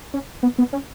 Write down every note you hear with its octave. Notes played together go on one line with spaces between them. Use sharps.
C#4
B3
B3
C#4